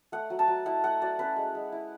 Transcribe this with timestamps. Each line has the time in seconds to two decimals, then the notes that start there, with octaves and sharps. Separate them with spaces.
0.12 A3 F#5
0.30 F#3
0.39 A5
0.48 F#3
0.66 E4 F#5
0.84 A3 F#5
1.01 F#3 D5
1.19 C#4 B4
1.36 G#3
1.55 G#3
1.72 E4